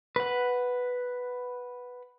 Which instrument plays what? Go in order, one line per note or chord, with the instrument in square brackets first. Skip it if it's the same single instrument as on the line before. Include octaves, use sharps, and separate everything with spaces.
[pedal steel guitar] B4 F#5